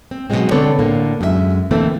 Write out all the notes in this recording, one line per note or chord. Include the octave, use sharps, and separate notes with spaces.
C4
G#2 B2 F3 F#3 G#3 C4
D3 B3 C4 A4 C#5 D5
A2 D3 A#3
F#2 G#3 G4 E5
B2 D3 E3 A3 A#3 C4